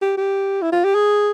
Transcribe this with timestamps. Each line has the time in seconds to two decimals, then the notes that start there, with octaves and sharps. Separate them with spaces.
0.02 G4
0.18 G4
0.62 E4
0.72 F4
0.85 G4
0.95 G#4